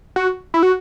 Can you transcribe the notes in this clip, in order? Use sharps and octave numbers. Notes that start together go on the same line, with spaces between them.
F#4
E4
F#4